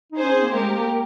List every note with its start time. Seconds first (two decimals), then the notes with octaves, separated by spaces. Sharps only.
0.12 D#4
0.18 C#4 G#4 C5
0.33 C4
0.43 A#3
0.53 G#3 G4 A#4
0.71 A#3